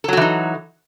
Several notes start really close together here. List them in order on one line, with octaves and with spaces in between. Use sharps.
A4 F#3 F#4 E3 D#4